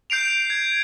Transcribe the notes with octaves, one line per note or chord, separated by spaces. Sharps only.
G6 C7 D7 F7
G#6